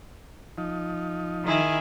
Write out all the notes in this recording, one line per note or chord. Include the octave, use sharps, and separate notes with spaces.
F3 D#4
D#3 E4 G#4